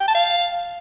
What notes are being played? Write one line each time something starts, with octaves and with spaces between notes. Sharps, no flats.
G5
A5
F5